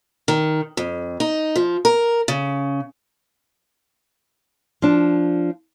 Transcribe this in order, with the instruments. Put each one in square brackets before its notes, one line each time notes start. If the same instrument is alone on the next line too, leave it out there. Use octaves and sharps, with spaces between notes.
[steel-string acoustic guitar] D#3
F2
D#4
F3
A#4
C#3
[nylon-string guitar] F3 D4